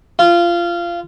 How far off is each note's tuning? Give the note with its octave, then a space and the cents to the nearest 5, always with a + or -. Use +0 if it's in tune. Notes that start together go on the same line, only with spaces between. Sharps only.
F4 -20